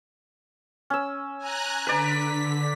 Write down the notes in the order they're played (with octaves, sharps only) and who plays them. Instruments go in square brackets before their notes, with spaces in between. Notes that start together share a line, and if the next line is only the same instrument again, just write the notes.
[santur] C#4 E6
[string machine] G#5 A#5 F#6
[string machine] D3 B6 [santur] B4 D5 A#5